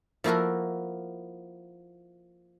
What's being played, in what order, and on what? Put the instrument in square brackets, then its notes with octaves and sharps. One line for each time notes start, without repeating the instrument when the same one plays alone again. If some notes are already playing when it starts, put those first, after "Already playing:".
[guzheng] F3 A#3 E4 F#4 A#4